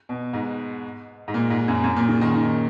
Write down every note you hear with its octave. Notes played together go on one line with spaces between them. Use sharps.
B2
G#2
G#2
A#2
G#2
F#2
F#2
A#2
C#3
D#3
D#3